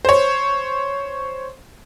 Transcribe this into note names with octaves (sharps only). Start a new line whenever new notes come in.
C5 C#5